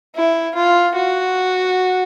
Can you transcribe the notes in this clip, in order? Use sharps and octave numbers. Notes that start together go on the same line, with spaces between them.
E4
F4
F#4